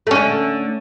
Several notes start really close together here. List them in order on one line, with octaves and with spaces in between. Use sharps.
A3 C#4 D3